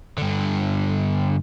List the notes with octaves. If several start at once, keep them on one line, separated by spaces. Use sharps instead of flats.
G2 D3